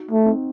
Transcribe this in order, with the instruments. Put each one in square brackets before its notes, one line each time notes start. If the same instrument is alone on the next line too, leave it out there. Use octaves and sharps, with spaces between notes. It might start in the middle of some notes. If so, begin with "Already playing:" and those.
Already playing: [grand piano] D#4 F#4
[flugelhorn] A3
[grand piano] C4 D#4